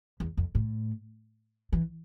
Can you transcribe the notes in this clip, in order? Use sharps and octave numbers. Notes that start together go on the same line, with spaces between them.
E2
F2
A2
E3